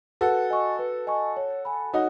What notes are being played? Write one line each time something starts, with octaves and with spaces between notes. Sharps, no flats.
F#4 A4 B4
D#5 G#5 C#6
B4
D#5 G#5 C#6
C#5
G#5 B5
D#4 F#4 C#5